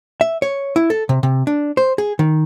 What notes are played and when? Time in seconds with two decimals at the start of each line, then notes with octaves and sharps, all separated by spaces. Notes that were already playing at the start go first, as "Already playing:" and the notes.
0.21 E5
0.42 C#5
0.76 E4
0.90 A4
1.09 C3
1.23 C3
1.47 D4
1.77 C5
1.98 G#4
2.19 D#3